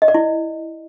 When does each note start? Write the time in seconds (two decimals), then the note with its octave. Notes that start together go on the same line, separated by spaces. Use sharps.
0.02 D#5
0.08 D5
0.14 E4